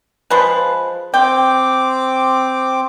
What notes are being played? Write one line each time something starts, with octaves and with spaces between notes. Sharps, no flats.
F3 G#3 B4
C4 G5 D6